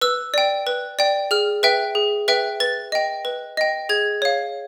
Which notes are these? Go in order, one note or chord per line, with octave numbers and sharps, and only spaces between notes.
B4 E6
D5 G5
B4
D5 G5
G#4 F6
B4 E5 G5
G#4
B4 E5 G5
B4 A6
D#5 G5
B4
D#5 G5
G#4 G#6
C#5 F5